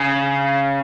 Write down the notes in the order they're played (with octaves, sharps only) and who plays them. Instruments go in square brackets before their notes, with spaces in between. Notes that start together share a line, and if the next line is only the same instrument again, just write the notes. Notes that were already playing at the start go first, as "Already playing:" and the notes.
Already playing: [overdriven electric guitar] C#3